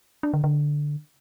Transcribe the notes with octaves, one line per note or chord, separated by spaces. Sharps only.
D4
D3
D3